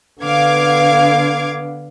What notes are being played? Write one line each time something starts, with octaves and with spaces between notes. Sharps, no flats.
D3 B3 F5 D6 G#6